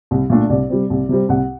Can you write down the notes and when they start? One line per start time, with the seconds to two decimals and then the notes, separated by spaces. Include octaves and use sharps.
0.11 C2
0.30 A#2 A3 D4
0.50 C2 D5
0.70 C3 G3 C4
0.90 C2
1.09 C3 G3 C4
1.29 C2 F#5